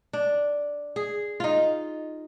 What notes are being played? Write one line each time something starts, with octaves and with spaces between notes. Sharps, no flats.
D4
G#4
D#4 F4